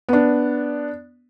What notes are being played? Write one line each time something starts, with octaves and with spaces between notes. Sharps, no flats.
B3 D4